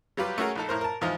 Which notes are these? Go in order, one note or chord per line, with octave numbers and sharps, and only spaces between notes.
F#3 G3 F4 G4 B4
A3 C#4 F#4 G#4 A#4
A#1 D#4 A4
A2 A#4 C5
A#4 A5
E2 G#2 F3 F4 D#5 D#6